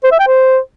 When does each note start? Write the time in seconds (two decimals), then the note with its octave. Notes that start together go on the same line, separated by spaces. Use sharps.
0.04 C5
0.12 E5
0.20 G5
0.27 C5